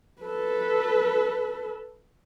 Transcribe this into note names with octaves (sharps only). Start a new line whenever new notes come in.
A4 B4